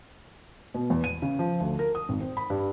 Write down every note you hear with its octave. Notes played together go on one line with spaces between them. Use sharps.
B2
E2
D#7
C#3
F3
D2
A#4
D#6
G#1
C4
B5
G2